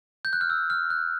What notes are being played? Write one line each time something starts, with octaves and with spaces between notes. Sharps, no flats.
G6
F#6
F6
E6
F6
F#6